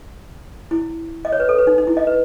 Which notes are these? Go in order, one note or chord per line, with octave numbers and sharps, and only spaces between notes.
E4
D#5
C#5
B4
A4
B4
D#4
D#4
E4
D#5
B4